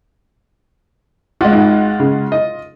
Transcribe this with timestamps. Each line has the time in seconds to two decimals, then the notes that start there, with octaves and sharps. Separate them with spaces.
1.41 G#3 F4 F#4
1.53 G#1
2.00 C#3
2.32 D#5